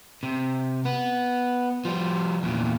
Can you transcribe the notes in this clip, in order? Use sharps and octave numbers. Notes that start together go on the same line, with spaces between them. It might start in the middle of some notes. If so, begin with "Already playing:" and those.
C3
B3
F3 G3
E2 A#2